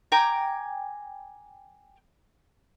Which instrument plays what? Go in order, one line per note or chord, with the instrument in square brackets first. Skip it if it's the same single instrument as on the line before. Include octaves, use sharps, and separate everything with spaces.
[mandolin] G5 G#5 A#5 D6